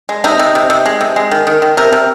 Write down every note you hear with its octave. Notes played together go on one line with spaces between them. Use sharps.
G#3
C3 D#4
C3
C3
C3
G#3
C3
G#3
D#3
D#3
D#3
C3 A#4
C3